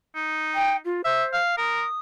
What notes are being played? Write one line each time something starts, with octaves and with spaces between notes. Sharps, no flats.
D#4
G5
F4
C5 E5
F5
A#4 D#6